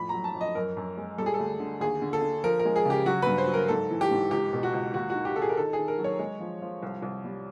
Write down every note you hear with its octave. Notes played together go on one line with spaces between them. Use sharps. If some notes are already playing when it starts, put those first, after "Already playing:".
Already playing: F2 A2 B5
F#3 A#5
A5
F2
D#5
F#2 A#4
F#2
G#3
G3 A4
G#4
A4
D2
D3
D#2 G#4
D3
A4
D3
F3 A#4
A#4
G#3
G#4
C#3 G4
F#3 F#4
G2 B4
C5
F#3
A#4
G#2 A4
E3
G4
G#2
C#2 G4
B2
F#4
C#2
D#2 F#4
D#3 F#4
G4
D#3 A4
G#4
A#4
D#3 A4
D#3 G#4
A#4
F#3
C#5
G#3
F3
F3
C2
C2
G3